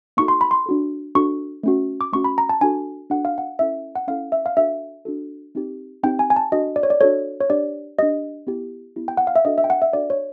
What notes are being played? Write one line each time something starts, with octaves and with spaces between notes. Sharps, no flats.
A#3 D#4 F#4 A4 C#6
C6
B5
C6
D4 F#4 A4
D4 F#4 A4 C#6
A3 C#4 F#4
D6
A3 C#4 F#4 C#6
B5
A#5
A5
D4 F#4 A4 G#5
D4 F#4 A4 F#5
F5
F#5
C#4 E4 A4 E5
F#5
C#4 E4 A4 F5
E5
F5
D4 F#4 A4 E5
D4 F#4 A4
C4 D#4 G4
C4 D#4 G4 G5
G#5
G#5
A5
D4 F#4 A4 D#5
D5
C#5
D5
D4 F#4 A4 C#5
C#5
D4 G4 D5
D4 G4 D#5
B3 E4 G4
B3 E4 G4
G5
F#5
F5
E5
D4 F#4 A4 D#5
E5
G5
F#5
E5
D4 F#4 A4 D5
C#5